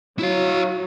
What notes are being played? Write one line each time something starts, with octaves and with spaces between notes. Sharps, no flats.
F#3 E4 F5